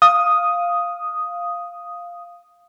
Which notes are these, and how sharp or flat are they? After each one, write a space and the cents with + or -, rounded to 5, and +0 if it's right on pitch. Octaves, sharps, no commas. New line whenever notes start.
F5 +0 D#6 +0